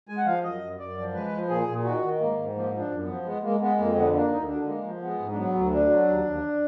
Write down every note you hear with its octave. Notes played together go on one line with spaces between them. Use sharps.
G#3 G#5
F#5
F3 F5
F#2 D#5
F#2
F#2 D5
F3
G#3 B4
F3
A#2 G#4
A#2
D#3 F#4
D#3
G#2 A#3
G#2
F3 A#3
F3
D4
F#2
B3
F3
G#3 B3
G#3 A#3
G#3 B3
F2 A#3
D3 B3
A#3 D4
D2 D#4
D3 D4
G#3 A#3
F3
G#3 B3
G#2
D4
F#3 B3
D2
D3 D4
F#3
D#2
D#2